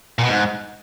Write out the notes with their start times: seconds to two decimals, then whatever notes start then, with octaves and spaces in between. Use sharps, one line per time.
0.19 A#2
0.24 B2
0.29 G#2